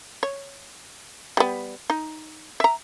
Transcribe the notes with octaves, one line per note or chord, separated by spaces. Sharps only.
C#5
G3 B3
D#4
E5 A#5